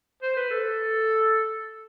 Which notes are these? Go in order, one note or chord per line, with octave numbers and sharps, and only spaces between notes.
C5
B4
A4